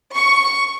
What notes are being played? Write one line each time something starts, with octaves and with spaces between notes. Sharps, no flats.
C#6